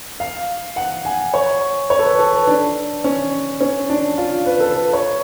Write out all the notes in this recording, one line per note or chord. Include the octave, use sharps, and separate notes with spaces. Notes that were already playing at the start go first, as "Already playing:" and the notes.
F5
F#5
G#5
C#5
C#5
A4
B4
A4
B4
D4
C#4
C#4
D4
F4
B4
A4
B4
C#5